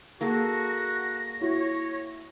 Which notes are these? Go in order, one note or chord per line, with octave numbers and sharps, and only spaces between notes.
A#3 F#4 G#4 A4 A#6
E4 F#4 C#5